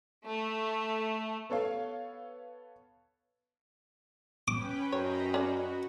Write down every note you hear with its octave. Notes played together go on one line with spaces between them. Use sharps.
A3
B3 A4 C#5 F5
C#4 B4 G5 D6
F#2 C#5 D#5 A#5 B5
C#4 F#4 D5